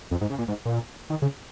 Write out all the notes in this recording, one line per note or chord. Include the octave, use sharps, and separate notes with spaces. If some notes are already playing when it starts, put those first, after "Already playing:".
F2
G#2
C#3
A#2
G#2
A#2
D#3
C#3